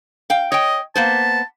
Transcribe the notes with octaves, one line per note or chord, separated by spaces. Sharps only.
F5 G5
C#5 D#5 G5
A#3 B3 C5 A5